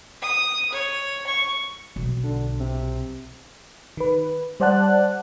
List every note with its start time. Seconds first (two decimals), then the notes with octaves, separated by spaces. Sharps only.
0.21 D#6
0.72 C#5
1.27 C#6
1.96 B1
2.24 D3
2.60 C3
3.97 D#3 B4
4.60 G3 C5 D5 F#5 A5 F#6